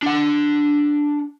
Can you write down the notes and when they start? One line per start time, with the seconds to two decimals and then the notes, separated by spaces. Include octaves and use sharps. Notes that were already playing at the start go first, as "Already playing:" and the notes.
0.02 D4 F#5